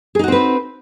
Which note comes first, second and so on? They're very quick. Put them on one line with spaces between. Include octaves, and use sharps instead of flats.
G#4 D#4 F#4 C4 B4